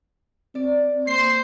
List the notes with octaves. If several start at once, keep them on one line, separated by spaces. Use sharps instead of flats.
C4 D5
A#3 C5 C7